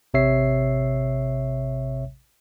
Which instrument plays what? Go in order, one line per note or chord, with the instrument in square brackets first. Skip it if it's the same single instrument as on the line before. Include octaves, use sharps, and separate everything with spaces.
[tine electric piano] A1 C3 C#5 E5 C7